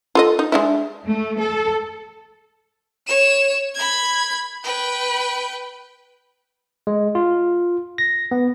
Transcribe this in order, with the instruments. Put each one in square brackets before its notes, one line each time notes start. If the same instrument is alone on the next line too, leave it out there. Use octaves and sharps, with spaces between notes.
[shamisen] F4 A4 D#5
D#4
G#3 D4 E4
[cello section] A3
A4
[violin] C#5 E7
B5 G#6
B4 G5
[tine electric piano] G#3
F4
A#6
B3